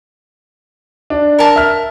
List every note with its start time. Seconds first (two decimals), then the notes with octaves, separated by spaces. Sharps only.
1.10 D4
1.39 A#4 A5
1.56 E5 F6